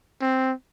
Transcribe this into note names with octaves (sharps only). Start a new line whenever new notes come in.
C4